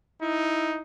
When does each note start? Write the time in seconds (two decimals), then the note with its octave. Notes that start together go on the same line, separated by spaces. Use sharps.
0.22 D#4 E4